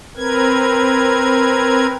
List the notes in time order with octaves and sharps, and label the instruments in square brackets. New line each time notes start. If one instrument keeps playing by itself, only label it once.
[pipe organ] C4 A#4 B4 G#6